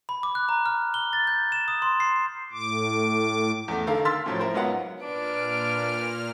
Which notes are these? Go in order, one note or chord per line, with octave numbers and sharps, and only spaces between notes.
B5
D6
F#6
A#5
F6
G7
A6
G6
E7
D#6
C6
C7
A2 D6
E2 A3
D3 D#3 A4 A#4 F5
C6 E6 F6 A6 B6
A2 F3 F#3
E4 A#4 C5
G#2 F#3 B3 F4 F#5
A#2 D4 B4 F6 D7